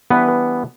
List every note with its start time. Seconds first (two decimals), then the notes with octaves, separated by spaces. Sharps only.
0.10 E3 G3 B3 D4 B4